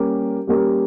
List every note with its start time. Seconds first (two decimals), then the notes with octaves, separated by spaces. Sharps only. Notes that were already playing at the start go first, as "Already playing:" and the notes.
Already playing: G3 A#3 C#4 G4 A#4
0.47 G3 A#3 C#4 G4 A#4